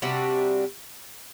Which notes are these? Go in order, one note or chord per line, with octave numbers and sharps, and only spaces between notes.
C3 G3 D4 F#4